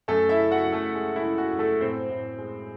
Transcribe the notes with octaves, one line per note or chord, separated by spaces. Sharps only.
F#2 A3 A4
E4 E5
C#3
F#4 F#5
F#2
A3 A4
G#3
E4
C#3
F#4
F#2
A3 A4
A2 C4 C5
A2
G#3